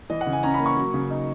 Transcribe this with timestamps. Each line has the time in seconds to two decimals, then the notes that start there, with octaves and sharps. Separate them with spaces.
0.10 E3 D#5
0.21 F#5
0.27 C#3
0.33 G#5
0.43 C#4 A#5
0.54 B5
0.60 A#3
0.66 C#6
0.77 F#3
0.94 C#3
1.10 D#4